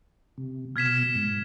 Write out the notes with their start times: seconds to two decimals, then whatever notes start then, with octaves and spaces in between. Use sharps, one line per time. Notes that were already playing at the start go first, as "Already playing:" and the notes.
0.38 C3
0.76 B2 F6 G#6 B6 E7
1.15 G#2